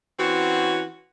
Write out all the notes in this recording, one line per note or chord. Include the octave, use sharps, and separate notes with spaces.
E3 C4 C#4 F#4